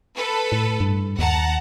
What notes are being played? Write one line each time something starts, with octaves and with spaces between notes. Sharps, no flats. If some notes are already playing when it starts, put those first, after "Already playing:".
A4 B4
A2
G2
D#2 F#5 A5 A#5